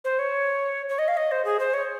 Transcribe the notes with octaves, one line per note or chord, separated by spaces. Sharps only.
C5
C#5
C#5
D#5
F5
D#5
C5
G#4
C5
C#5